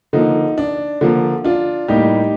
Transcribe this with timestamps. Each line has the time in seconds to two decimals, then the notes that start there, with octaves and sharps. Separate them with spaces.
0.13 D3 F3 A#3 D#4
0.58 D4
1.01 D3 F3 A#3
1.44 D4 F4
1.88 A2 G3 A#3 D#4 G4